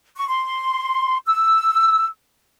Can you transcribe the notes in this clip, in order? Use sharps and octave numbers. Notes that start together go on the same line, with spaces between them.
C#6
C6
E6